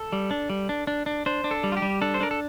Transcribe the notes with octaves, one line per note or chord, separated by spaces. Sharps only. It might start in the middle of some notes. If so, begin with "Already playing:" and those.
Already playing: A4
G3
D4
G3
D4
D4
D4
D4 C5
D4
A4
G3
F4
G4
G3
D4 A4
C5
D4 A#4
A4